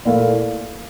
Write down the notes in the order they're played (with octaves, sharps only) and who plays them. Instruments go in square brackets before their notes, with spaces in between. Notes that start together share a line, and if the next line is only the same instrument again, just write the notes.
[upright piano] A#2 A3 E4 A#4 F5